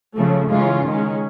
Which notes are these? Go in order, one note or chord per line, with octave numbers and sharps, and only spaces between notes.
C#3 F3 A3
C#3 E3 G#3 C#4 F4
D#3 G#3 C#4